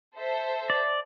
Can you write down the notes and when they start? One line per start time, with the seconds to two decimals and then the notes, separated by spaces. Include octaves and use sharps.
0.15 A4 C5 E5
0.70 D5